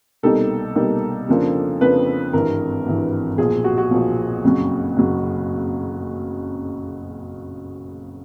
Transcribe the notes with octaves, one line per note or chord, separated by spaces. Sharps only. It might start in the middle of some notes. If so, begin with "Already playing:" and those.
C2 B2 G3 A#3 D#4 A4
C2 B2 G3 A#3 D#4
F2 C#3 F3 A#3 D4
F2 C#3 F3 A#3 D4 B4
G#1 G2 E3 A#4
G#1 G2 E3
B1 A#2 F3 G#4
F#4
F#4
B1 A#2 F3
F#1 F2 C#3 F#3
F#1 F2 C#3 F#3